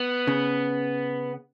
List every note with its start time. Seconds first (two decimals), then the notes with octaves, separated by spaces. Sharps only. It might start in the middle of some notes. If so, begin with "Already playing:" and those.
Already playing: B3
0.27 C#3